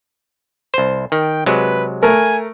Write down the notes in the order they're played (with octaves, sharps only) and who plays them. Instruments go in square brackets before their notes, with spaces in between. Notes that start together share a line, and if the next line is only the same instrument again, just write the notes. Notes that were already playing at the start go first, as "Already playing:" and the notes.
[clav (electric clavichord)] C2 C5
[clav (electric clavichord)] D#3 [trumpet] G5
[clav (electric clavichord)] C3 F#3 G#3 [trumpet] B4
[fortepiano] A3 A#4 [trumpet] G#5